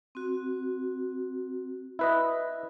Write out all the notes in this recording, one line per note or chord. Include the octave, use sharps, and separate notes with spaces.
C4 F#4
E4 B4 D#5